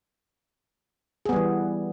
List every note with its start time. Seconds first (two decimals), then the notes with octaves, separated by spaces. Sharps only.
1.26 G#4
1.29 B3
1.33 G3
1.36 E3